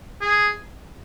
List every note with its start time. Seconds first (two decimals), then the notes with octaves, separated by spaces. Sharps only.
0.21 G#4